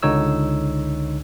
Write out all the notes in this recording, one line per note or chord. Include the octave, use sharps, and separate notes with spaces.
C#2 D3 D#4 C#5 E6